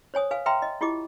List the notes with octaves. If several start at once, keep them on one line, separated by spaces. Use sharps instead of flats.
C5 C#5 G#5 D#6
B4 F5 G#5
B4 E5 G5 A#5 C6
D#5
E4 F4 G4 D#5 D6